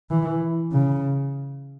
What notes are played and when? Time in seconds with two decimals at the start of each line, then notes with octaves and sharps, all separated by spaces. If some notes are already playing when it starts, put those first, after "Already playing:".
0.10 E3
0.73 C#3